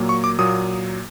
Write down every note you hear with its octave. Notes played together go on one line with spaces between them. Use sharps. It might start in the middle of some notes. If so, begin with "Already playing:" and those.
Already playing: A#2 F#3 A#3
C#6
D6
A#2 F#3 A#3 D#6